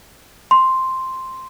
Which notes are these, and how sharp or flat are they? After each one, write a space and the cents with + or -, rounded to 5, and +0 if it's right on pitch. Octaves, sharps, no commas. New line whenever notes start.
C6 +0